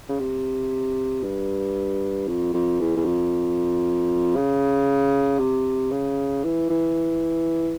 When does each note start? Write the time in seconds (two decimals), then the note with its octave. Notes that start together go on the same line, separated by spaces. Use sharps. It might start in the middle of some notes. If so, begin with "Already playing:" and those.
0.09 C#3
0.20 C3
1.24 G2
2.28 F2
2.54 F2
2.80 E2
2.96 E2
3.06 F2
4.36 C#3
5.39 C3
5.91 C#3
6.44 E3
6.70 E3